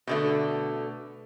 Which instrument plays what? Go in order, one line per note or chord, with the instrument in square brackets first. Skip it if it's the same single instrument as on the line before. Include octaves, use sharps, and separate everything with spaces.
[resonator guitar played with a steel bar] B2 D3 A3